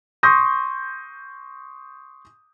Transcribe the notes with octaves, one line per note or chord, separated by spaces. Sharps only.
C6 C#6 D#6 G6 A#6